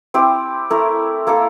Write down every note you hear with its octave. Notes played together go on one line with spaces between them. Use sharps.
C4 E4 G4
A3 E4 A#4
A#3 E4 A4